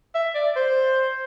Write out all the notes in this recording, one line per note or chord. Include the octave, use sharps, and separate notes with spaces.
E5
D5
C5